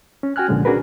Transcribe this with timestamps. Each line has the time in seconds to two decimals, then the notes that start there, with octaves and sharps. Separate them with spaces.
0.23 C#4
0.36 F#4 G5 G#5 F6 F#6
0.48 C2 A#2 D3 F3 G#3 C#4
0.65 C#4 D4 F#4 G#4 A#4 B4